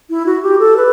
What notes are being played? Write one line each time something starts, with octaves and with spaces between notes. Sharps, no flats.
E4
F#4
G4
A4
B4